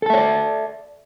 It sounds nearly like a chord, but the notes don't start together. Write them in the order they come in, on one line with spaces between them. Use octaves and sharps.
A4 A5 E5 C#5 D5